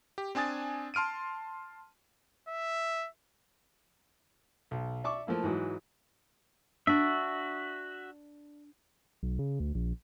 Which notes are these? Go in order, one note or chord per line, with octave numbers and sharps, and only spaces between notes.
G4
C4 D4 G#5 D#6 A6
A5 C6 F6 D7 D#7
E5
B1
D5 E5 C#6 D6
F3 A3 A#3 E4
G#2 E3 F#3
D4 F#4 E5
B1
C#3
D2
A#1